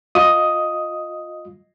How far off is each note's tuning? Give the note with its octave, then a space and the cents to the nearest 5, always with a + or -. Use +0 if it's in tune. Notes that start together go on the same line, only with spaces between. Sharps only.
F4 +20 D#5 +0 D#6 +5